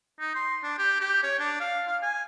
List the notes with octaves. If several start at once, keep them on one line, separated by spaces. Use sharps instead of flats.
D#4
C6
D4
G4
G4
C#5
D4
F5
F5
G#5